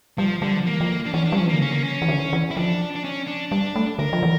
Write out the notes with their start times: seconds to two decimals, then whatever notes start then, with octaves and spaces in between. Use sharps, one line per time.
0.18 F3 G3
0.42 D3 G3
0.55 F3
0.67 E3 A#3
0.81 F3
1.06 D4
1.13 E3 C#4
1.26 D4
1.32 G3
1.37 F3 C#4
1.47 E3 A#3
1.53 D3
1.61 C#3 C#4
1.71 A#3
1.83 C#4
2.02 E3
2.08 D3
2.33 E3
2.51 E4
2.56 F3 D4
2.96 D4
3.04 C#4
3.27 D4
3.52 G3 D4
3.76 A3
3.99 D3 A#4
4.13 F3
4.23 E3